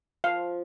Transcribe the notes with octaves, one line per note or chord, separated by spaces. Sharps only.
F3 F5